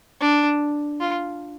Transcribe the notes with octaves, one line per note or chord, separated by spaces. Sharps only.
D4
F4